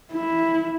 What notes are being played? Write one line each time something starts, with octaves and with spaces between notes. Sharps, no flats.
E4